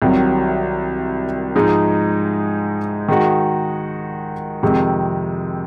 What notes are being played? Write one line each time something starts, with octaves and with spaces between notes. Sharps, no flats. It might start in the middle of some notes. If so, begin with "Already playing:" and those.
C2 C3 D#3 F#3
G#2 F3 G#3 D#4
D#3 G#3 D#4 F#4
F2 C3 D#3 G#3